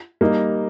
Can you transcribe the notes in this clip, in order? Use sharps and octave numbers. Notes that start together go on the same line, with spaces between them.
G3 A#3 D#4